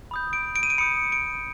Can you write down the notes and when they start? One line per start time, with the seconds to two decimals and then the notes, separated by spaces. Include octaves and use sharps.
0.11 B5 D#6 G6
0.33 D7
0.56 D7
0.63 D#7
0.70 D7
0.78 B5 D#6 G6 C#7
1.12 D7